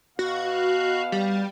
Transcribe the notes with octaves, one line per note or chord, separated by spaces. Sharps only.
B2 F#4 F5
G3